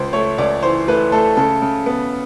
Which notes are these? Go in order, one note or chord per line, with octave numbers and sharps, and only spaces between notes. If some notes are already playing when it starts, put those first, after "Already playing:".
Already playing: C#2 C5
A3 C#5
C#2 D5
E3 C5
A3 B4
A3 A4
C#3 A4
C#3
B3